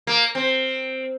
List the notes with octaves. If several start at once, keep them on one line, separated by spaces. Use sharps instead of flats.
A#3
C4